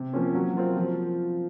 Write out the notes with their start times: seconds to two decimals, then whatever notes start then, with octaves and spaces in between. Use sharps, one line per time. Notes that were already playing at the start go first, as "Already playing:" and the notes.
Already playing: C3
0.13 F3 A#3 C#4
0.35 F#3
0.56 C4 F4 A#4
0.76 F3